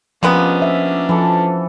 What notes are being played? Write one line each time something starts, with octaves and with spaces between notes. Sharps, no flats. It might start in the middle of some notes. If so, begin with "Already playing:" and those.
C3 F3 G#3 A#3 B3 C#4 D4 D#5
E5
E3 F3 A4